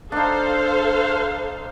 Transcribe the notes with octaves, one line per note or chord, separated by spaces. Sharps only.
D4 D#4 A4 C5 F5